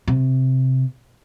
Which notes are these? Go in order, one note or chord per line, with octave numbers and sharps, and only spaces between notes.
C3